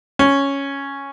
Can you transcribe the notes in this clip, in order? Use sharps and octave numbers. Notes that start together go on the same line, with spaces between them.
C#4